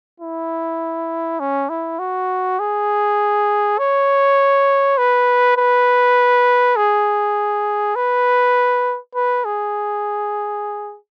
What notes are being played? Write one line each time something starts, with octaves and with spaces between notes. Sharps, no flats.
E4
C#4
E4
F#4
G#4
C#5
B4
B4
G#4
B4
B4
G#4